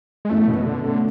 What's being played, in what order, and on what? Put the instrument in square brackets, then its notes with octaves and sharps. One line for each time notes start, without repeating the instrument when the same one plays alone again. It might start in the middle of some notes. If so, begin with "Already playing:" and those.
[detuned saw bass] G#3
[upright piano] F#2 E3 B3 [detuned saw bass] A3
[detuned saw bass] B2
D3
[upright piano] B2 A3 C#4 [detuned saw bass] D3